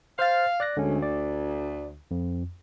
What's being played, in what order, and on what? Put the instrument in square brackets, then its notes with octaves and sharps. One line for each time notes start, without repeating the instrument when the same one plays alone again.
[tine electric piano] C5 F6 A6 [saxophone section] F5
[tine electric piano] D5 F#6 A#6
[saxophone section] D2 [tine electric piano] D3 G#3 C#4
[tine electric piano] D5
F2